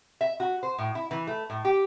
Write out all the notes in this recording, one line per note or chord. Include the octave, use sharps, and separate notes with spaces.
E5
F#4
C5
A2
E4
E3
A3
A2
G4